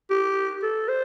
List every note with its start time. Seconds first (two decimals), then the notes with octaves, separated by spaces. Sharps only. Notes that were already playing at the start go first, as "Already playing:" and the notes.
0.10 G4
0.63 A4
0.88 C5